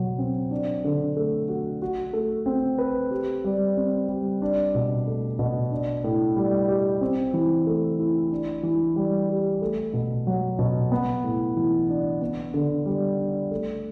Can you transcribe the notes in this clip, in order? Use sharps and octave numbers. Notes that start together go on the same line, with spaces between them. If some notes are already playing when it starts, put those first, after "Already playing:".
Already playing: B2 F#3
C4
D4
D3
A3
F#4
F#4
A3
C4
B4
G4
G3
C4
G3
D4
B2
A3
B2
D4
A2
G3
G4
C4
E3
A3
E4
D4
E3
G3
G4
A3
B2
F#3
B2
B3
A2
E3
D4
B3
D3
G3
D4
A3